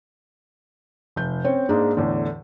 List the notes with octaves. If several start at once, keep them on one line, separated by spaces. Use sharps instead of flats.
F1 G6
C4 C#4 C#5
G#2 G#3 A#3 D4
E2 A2 D3